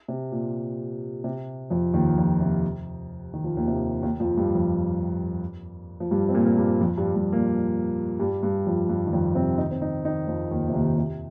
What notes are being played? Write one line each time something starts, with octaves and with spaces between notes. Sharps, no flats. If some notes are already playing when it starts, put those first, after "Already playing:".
C3
A#2
C3
F2 F3
D#2 D#3
F2 F3
C3
D#3
F3
D#2 D#3
C3
D#2 D#3
F2 F3
G2 G3
F2 F3
F3
G2 G3
C4
A#2 A#3
A#3
G2 G3
F2 F3
G2 G3
G2 G3
A#2 A#3
G2 G3
G2 G3
F2 F3
G2 G3
D#3
F2 F3
C3 C4
D#3 D#4
C4
D#3 D#4
D#3 D#4
F2 F3
D#2 D#3
C3
D#2 D#3
C3